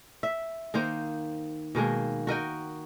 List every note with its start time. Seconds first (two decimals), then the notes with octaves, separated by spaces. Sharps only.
0.23 E5
0.74 D#3 A#3 D#4 C5
1.75 B2 D#3 G#3 A#3
2.27 F#4 A#4 D#5 G5